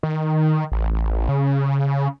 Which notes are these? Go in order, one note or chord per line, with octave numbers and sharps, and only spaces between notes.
D#3
A1
C#3